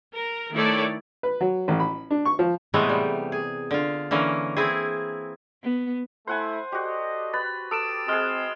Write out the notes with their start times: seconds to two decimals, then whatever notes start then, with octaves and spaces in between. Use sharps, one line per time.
0.15 A#4
0.53 D#3 A3 E4 A4 C#5 D5
1.23 B4
1.41 F#3
1.68 A1
1.80 B5
2.11 D4
2.25 C#6
2.39 F3
2.74 A2 C3 E3 G#3 A3 B3
2.89 G3
3.32 G#4
3.71 D3 F4
4.11 D3 E3 A#3 C#4
4.57 C4 E4 G#4
5.63 B3
6.27 A3 E4 C5 F#5 G#5
6.72 F#4 G4 A4 D5 D#5
7.34 B4 A6
7.71 A4 D6 D#6 D7 E7
8.08 G#3 C4 G#4 D#6 F6